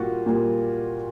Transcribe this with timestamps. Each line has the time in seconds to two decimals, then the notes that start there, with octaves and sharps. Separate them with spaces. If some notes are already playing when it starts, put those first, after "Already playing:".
Already playing: A#2 G3 A#3 F4 F#4
0.26 A#2 G3 A#3